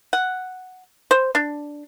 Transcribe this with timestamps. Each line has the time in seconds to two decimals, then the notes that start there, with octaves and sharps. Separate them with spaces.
0.13 F#5
1.11 C5
1.35 D4